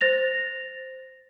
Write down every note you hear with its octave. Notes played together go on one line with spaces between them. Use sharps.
C5 A6 A#6 F7